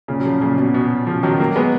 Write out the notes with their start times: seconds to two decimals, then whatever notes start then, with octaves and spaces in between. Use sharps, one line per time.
0.08 A#2 C#3
0.20 F#3
0.25 C#3 F3
0.41 A#2 C#3
0.58 B2
0.74 B2
1.07 C#3 F3
1.23 D#3 F#3
1.40 F#3 A#3
1.55 G#3 B3